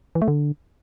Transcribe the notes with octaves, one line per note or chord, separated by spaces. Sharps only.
E3
A3
D3